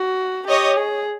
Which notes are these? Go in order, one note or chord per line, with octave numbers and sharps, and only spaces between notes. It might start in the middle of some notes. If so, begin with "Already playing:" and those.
Already playing: F#4
G4 C#5 D#5
G#4